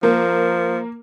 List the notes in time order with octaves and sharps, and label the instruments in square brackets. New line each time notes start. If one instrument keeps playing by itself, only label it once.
[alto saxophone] F3 [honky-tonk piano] A#3